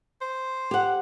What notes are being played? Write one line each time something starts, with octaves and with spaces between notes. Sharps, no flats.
C5
G4 F#5